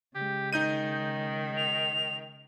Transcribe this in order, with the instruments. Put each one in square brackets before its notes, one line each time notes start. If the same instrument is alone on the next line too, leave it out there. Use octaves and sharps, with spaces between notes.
[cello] C#3 G#3 [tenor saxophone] G4
[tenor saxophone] D#3 [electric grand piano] D#4 G6 D#7
[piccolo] F7